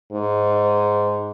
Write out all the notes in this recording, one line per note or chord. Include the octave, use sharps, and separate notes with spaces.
G#2